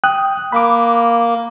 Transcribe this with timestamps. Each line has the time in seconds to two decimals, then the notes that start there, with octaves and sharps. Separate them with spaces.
0.04 G5 D#6 F#6
0.52 A#3 B5 D6